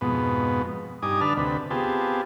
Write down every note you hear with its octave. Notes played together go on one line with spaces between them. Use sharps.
F2 G#2 B2 B3
G2 D#4 G#5 D6 D#6
D3 D4 B4 A5 F6
D2 C3 B4
B3 C4 F4 G4 G#4 A5